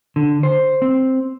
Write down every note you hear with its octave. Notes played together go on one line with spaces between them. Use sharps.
D3
C5
C4